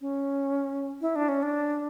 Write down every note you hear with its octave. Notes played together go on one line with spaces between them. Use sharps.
C#4
E4
D4
C#4
D4